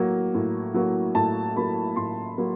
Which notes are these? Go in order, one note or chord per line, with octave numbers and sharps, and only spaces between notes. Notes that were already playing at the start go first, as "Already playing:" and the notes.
Already playing: A2 F#3 A#3
A2
F#3 A#3
A2 A5
F#3 A#3 B5
A2 C6
F#3 A#3